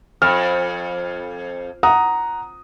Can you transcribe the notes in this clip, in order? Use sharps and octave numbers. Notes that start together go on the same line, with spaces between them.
F2 F6
F#5 A#5 D#6